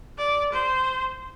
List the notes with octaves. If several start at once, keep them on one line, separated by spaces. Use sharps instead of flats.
D5
C5